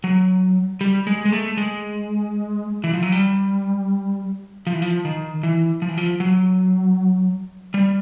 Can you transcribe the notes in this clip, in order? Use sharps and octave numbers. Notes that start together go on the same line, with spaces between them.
F#3
G3
G#3
G#3
A3
G#3
E3
F3
F#3
G3
F3
E3
F3
D#3
E3
F3
E3
F3
F#3
G3